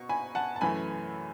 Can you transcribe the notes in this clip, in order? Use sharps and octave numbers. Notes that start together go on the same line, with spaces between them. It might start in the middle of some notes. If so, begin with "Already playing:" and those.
Already playing: B2 C#6
G#5 B5
F#5 A5
A5
F#2 E3 A3 G#5 B5